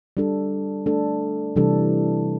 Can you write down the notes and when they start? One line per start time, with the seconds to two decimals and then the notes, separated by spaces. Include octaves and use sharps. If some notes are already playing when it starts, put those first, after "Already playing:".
0.17 G3 D4 A4
0.86 A3 D4 A4
1.56 C3 E3 G3 D4 A4